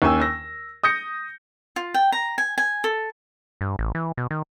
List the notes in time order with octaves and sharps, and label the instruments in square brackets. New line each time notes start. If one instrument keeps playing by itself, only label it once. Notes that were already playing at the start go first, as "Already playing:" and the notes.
[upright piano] D#2 C#4 G#5 E6
E6 A#6
D#6 G6 A#6 C#7
[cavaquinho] F4
G5
A#5
G#5
G#5
A4
[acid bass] G2
A1
E3
B2
D#3